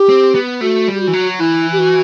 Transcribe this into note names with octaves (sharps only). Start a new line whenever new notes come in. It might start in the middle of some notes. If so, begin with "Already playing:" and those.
Already playing: G4
C4
B3
A3 F#4
G3
G4
F#4
E3
F#3
E3 E4
G4
F#4